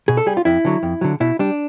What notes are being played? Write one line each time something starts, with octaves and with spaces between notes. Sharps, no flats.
B2 G#4
A4
G3 G#4
F4
F2 E4
D3 F#3
F2
D3 F#3
B2 E4
G3 D4